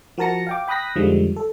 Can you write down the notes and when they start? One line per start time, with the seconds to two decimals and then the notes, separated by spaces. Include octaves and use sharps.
0.18 F3 F#4 A#4 A5 A#6 C#7
0.47 F5 G5 D6
0.68 G5 B5 D#6 F#6 A#6 B6
0.95 F2 D3 D#3 F3 G3 G#3
1.36 A4